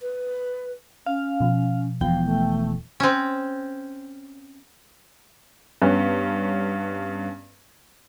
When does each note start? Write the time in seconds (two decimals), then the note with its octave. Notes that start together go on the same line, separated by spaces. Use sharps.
0.01 B4
1.06 C#4 F5
1.40 B2 F3
2.01 E1 E2 F3 F5 G5
2.26 A3
3.00 C4 C#4
5.82 G2 B3 C#4